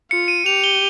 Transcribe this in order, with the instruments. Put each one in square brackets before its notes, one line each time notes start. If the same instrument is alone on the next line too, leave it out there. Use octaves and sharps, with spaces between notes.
[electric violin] F4 [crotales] C#7
[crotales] D#7
[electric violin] G4 [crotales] F7
[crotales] G7